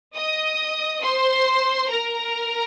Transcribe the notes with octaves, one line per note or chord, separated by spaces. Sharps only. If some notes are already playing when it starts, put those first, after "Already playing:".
D#5 D#6
C5 C6
A#4 A#5